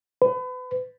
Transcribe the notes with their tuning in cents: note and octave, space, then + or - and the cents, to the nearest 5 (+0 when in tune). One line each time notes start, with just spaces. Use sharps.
B4 +35